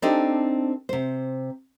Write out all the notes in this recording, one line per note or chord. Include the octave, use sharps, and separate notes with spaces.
C4 D4 D#4 G4 A4 C5
C3 C5